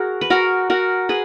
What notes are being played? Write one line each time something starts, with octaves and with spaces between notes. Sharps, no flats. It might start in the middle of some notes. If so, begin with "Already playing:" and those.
Already playing: F#4 G#4 A#4
B4
F#4 A#4
F#4 A#4
G#4 B4